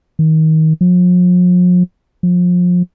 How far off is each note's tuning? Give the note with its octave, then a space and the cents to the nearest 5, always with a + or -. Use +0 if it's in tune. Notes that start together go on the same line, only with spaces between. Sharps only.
D#3 +25
F3 +45
F3 +30